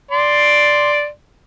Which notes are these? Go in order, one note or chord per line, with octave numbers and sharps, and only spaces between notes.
D5 C6